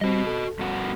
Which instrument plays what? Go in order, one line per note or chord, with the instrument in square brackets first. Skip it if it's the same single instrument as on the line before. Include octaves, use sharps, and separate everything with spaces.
[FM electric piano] G3 C4 [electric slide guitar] F#4 D#5
[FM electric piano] A4
[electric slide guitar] G2 B2 F#4